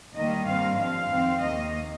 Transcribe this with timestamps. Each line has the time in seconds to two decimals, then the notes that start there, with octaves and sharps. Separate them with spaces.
0.15 D#2 D#3 G3 A#3 D#5
0.47 G2 G3 C4 F5
0.79 G2 F3 C4 F5
1.11 F2 D#3 C4
1.42 D#2 D#3 A#3 D#5